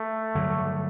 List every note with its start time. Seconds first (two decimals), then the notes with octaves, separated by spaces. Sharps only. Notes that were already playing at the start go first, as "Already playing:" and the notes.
Already playing: A3
0.35 G2 D3 F#3